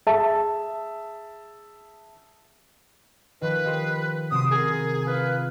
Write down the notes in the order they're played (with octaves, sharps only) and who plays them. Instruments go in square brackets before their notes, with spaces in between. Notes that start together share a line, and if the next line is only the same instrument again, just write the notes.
[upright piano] G#4 E5 A5
[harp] D#3 F3 [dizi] B4
[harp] D#4 G4 C5
[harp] C3 F#3 C6 [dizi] D#6
[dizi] G#4 [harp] A#4
[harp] F4 F5 [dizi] B4